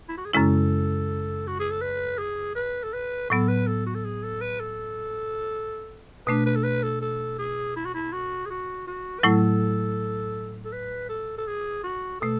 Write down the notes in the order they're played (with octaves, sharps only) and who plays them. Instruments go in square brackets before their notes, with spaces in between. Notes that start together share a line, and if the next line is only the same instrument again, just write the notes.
[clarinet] E4
F#4
G#4
[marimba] F#2 C#3 G#3 C#4 E4 [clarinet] A4
[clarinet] F#4
G#4
A4
B4
G#4
B4
A4
B4
[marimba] A2 F#3 B3 [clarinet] A4
[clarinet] B4
A4
F#4
A4
G#4
A4
B4
A4
[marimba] B2 A3 D4 [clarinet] B4
[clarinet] B4
A4
B4
A4
A4
G#4
E4
F#4
E4
F#4
G#4
F#4
F#4
B4
[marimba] A2 F#3 A3 E4 [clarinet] A4
[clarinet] A4
B4
A4
A4
G#4
F#4
[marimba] B2 A3 [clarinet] A4